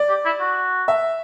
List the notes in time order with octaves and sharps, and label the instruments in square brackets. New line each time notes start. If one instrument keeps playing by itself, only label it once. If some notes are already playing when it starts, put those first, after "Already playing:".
Already playing: [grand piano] D5
[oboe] G4
E4
F#4
[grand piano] E5